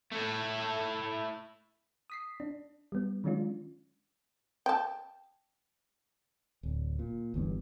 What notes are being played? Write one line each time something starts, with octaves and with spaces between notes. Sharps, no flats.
A3 E4
D#6 B6 C7
D4
G3 B3
D#3 F#3 G#3 C#4 D4 F4
G5 A5
D1
A#2
G1 E2 G2